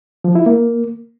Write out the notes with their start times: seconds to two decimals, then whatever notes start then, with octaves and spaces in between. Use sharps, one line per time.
0.24 F3
0.35 E4
0.46 A#3